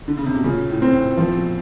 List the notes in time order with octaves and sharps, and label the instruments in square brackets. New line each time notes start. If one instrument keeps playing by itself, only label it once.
[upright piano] D3
C#3
C3
B2
[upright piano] A#2 [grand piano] C#3
[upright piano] A2
[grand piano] C4
[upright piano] A2
[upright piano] A#2 [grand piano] F3
[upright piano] B2